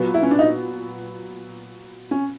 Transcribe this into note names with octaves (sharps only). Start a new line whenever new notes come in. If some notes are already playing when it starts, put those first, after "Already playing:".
Already playing: A#2 F#3 B3
E4
C#4
D4
D#4
C#4